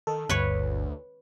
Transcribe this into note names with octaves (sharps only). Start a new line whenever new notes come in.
D#3 A4
G1 D2 B4 C#5